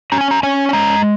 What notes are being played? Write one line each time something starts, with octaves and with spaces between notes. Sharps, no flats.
C#4 A#5
G#5
A#5
C#4 G#5
G#5
G#3 A#5